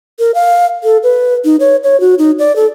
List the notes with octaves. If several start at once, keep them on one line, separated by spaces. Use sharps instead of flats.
A#4
F5
A4
B4
D#4
C#5
C#5
F#4
D#4
D5
A4